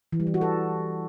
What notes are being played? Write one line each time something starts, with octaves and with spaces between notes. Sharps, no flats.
E3
G3
E3
F#4
A4